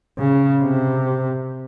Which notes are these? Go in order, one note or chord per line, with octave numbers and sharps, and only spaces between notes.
C#3
C3